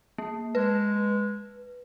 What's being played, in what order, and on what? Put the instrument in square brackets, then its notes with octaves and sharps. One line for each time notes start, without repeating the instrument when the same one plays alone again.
[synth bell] A#3
[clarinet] G#3 [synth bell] B4